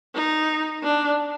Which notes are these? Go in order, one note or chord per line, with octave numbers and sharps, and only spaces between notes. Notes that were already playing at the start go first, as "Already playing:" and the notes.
D#4
D4